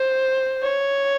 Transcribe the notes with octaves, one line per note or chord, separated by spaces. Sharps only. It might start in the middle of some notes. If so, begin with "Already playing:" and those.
Already playing: C5
C#5